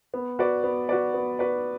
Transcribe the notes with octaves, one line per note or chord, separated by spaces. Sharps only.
B3
F#4 B4 D5
B3
F#4 B4 D5
B3
F#4 B4 D5